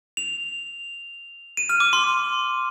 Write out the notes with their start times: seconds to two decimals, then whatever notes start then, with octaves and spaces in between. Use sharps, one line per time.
0.17 F7
1.57 D#7
1.69 F6
1.80 D6
1.93 C6